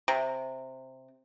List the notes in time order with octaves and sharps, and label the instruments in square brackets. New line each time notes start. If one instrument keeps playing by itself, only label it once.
[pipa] C3